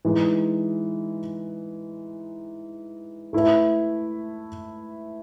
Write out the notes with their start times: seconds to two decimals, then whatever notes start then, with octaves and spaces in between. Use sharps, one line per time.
0.05 E3 G#3 D#4
3.33 A3 E4 B4 E5